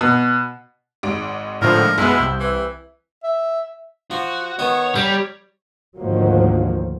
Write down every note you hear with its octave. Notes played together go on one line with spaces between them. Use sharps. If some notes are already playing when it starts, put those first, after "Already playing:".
B2
G#1 G#2 D7
A2 D3 F3 A#4
B1 G#3 B3 E4
C2 E6 G6
E3
E5
F3 F#4
D#3 B3 C#5
G3 A#5
D2 G#2 D#3 F3 F#3 A#3